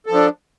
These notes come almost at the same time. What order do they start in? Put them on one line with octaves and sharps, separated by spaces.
A4 F3 D4